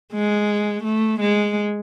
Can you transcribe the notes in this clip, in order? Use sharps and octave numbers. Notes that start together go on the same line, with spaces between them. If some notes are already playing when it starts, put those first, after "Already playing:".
G#3
A3
G#3